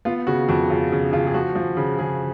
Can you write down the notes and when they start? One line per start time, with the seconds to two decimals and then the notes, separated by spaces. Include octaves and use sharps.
0.05 B3 F4
0.27 C#3 F#4
0.49 F2 F#4
0.70 C#3 F4
0.92 C#3
1.13 C#3 F4
1.27 G#4
1.34 F3 F#4
1.55 F3
1.77 C#3
1.99 C#3 G#4